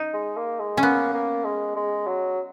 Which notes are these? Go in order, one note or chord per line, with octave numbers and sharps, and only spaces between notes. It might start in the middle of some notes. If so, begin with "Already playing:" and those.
Already playing: D#4
G#3
A#3
G#3
C#4
A#3 B3
A#3
G#3
G#3
F#3